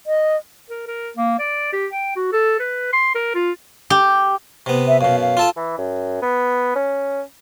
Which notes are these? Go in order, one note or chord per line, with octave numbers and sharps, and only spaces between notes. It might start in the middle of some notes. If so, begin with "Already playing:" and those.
D#5
A#4
A#4
A#3
D5
G4
G5
F#4
A4
B4
C6
A#4
F4
G4
C3 B3
E5
F#2 B2 F5
F5
F4 A4 A5
E3
F#2
B3
C#4